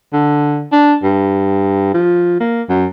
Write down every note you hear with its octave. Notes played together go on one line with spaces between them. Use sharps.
D3
D4
G2
F3
A#3
F#2